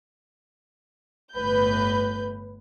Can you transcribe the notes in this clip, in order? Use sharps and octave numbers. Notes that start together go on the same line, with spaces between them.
G1 A2 B4 G6